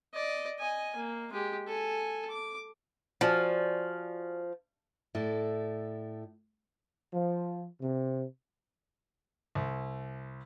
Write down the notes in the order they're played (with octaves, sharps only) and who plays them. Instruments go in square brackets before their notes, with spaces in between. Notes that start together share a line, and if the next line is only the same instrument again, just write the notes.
[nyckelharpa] D5 D#5
D#5 G#5
A#3
G#3 G4
A4 G#5
D6
[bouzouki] F3 [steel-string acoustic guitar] F#4 D5 G#5
[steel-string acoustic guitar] A2 E4 A4 D5
[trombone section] F3
C3
[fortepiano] C2